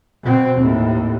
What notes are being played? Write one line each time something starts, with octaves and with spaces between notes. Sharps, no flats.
B2 C4
D#2 A2